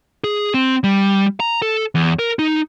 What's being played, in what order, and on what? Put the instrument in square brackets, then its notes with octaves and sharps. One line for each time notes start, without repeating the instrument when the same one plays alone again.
[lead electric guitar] G#4
C4
G3
A#5
A4
E2
A#4
D#4